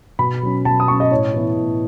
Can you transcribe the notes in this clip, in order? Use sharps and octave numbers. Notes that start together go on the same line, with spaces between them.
B2 B5
F#3 C#4
B2 A5
D#6
F#3 C#4 C#6
D#5
A2 C#5
E3 B3 E4
A2